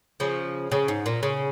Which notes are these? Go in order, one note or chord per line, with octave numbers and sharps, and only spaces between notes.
C#3 F3
C#3
G#2
A#2
C#3